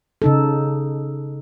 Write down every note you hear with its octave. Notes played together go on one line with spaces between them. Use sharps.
C#3 D#4 A4